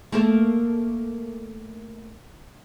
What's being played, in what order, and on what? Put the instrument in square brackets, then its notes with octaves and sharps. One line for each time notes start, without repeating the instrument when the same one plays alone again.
[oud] A3 A#3 A4